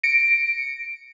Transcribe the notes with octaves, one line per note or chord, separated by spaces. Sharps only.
A#6 C#7 D7